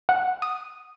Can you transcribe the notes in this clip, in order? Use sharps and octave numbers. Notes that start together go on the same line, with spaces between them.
F#5
D#6